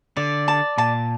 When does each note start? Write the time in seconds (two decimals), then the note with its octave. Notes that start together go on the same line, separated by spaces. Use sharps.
0.17 D3 D5
0.48 A5
0.78 A#2 A5